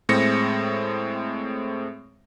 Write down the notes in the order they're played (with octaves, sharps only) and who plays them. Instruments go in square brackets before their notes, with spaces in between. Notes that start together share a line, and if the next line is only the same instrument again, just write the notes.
[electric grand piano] A2 G#3 C4 A#6 C#7